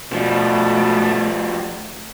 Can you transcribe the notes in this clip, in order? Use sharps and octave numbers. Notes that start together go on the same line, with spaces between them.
B2 F3 G3 A3